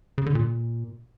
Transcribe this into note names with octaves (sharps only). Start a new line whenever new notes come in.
C#3
D3
A#2